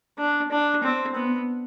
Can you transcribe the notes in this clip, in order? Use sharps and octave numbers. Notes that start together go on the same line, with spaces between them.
D4
D4
C4
B3